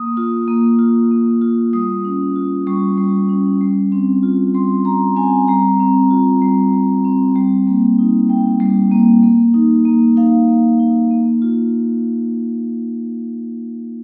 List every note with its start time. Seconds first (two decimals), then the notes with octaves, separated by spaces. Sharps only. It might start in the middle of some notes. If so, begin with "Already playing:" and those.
Already playing: A#3 D#6
0.17 F4
0.48 A#3
0.79 F4
1.11 A#3
1.41 F4
1.73 G3 D#6
2.04 C#4
2.36 F4
2.67 G3 C#6
2.98 G3
3.29 C#4
3.61 G3
3.92 C4
4.23 F4
4.54 G3 C6
4.85 G3 A#5
5.16 C4 G#5
5.48 G3 A#5
5.80 C4
6.11 F4
6.41 G3
6.72 G3
7.05 C4
7.36 G3
7.67 A#3
7.99 D#4
8.29 G3 G5
8.60 G3
8.92 A#3
9.23 A#3
9.54 D#4
9.85 A#3
10.16 D#4 F5
10.48 A#3
10.80 D#4
11.11 A#3
11.42 F4